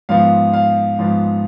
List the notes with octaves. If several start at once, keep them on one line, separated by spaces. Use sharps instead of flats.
G#2 F3 B3 F5
F5
G#2 F3 B3